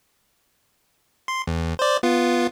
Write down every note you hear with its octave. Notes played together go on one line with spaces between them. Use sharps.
C6
E2
C5 D5
B3 F4